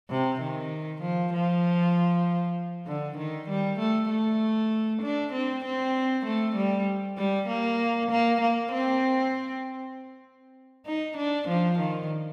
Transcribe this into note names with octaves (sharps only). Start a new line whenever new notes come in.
C3
D#3
F3
F3
D3
D#3
G3
A3
A3
D4
C4
C4
A3
G3
G3
A#3
A#3
A#3
C4
D#4
D4
F3
D#3